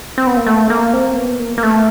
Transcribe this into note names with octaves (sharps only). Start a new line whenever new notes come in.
C4
B3
A#3
A3
A#3
C4
B3
A#3
A#3
A3